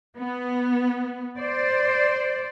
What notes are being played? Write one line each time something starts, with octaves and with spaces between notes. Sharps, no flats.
B3
C5 D5